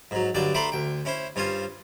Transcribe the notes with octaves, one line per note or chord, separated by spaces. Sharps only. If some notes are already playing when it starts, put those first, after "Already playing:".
G#2 F#3
G2 D3 F#3 D5 G5
A3 D4 C5 G5 A#5 B5
D2 G5
C#4 E4 C5
G2 C#4 F4 C5 G#5